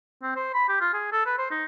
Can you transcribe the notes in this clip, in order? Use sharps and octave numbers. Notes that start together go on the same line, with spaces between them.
C4
C5
B5
G4
F4
G#4
A4
B4
C5
D#4